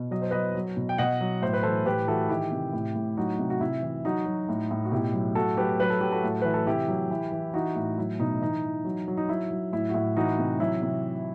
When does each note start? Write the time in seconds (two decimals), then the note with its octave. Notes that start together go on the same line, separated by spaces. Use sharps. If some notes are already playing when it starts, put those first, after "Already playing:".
Already playing: B2
0.11 F#3 D#5
0.22 C5
0.31 F#3 B4 D#5
0.55 F#3
0.77 B2
0.89 G5
0.98 B2 D#5 F#5
1.21 F#3
1.42 A2 C5
1.53 B4
1.63 E3 A4 C5
1.86 A2 G4 B4
2.08 E3 F#4 A4
2.29 D#3 E4 G4
2.52 C3
2.73 A2
2.96 A2
3.17 F#3 D#4 F#4
3.39 C3
3.50 F#4
3.60 C3 E4
3.82 E3
4.05 F#3 D#4 F#4
4.26 F#3
4.49 A2
4.71 A2
4.85 F#4
4.92 B2 E4 G4
5.13 F#3
5.35 A2 F#4 A4
5.57 F#3 G4 B4
5.80 F#3 B4
5.90 A4
6.01 F#3 G4
6.12 F#4 A4
6.23 A2
6.42 E3 B4
6.54 A4
6.67 C3 E4 G4
6.88 F#3
7.10 E3
7.32 E3
7.54 E3 D#4 F#4
7.76 A2
7.98 F#3 E4
8.20 B2 D#4
8.41 E3 D#4
8.64 E3
8.85 F#3
9.08 F#3
9.17 D#4
9.29 F#3 E4
9.51 F#3
9.73 A2 E4
9.89 F#4
9.94 A2 E4
10.16 E3 D#4 F#4
10.38 C3
10.59 F#3 E4
10.82 C3